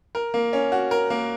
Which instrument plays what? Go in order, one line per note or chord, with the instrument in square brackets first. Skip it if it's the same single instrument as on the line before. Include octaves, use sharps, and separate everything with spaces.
[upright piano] A#4
A#3
C#4
F#4
A#4
A#3